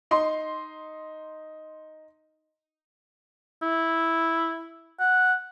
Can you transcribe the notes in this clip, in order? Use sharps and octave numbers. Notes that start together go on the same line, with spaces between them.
D#4 C6
E4
F#5